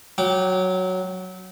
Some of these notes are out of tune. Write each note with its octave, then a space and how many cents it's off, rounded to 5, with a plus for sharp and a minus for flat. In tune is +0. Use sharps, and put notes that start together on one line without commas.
F#3 +0 G5 -30 D6 +0